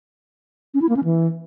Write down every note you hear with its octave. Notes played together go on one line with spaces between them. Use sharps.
C#4
E4
A#3
C#4
E3